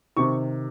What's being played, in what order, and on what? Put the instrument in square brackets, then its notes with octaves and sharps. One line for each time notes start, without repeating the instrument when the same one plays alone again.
[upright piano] C3 D#3 C#6